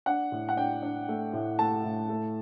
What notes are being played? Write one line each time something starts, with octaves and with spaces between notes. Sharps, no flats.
D4 F#5
A2
F#5
D4 G5
D4
A3
A2
A3 A5
A2
A3